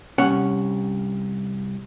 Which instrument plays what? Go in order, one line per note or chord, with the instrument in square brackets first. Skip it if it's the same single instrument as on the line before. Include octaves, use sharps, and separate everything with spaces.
[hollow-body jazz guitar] C2 C#4 F#5